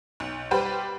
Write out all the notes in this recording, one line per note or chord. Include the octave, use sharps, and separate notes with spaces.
B1
G3 G4 B4 C5